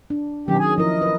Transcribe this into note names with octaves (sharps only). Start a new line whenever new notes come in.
D4
B2 D#3 F#3 C#4 G4
G#4 G#5
F3 E4 A#4 D#5
A#4 B4